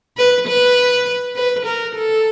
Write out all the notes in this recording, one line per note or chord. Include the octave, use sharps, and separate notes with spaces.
B4
B4
B4
A#4
A4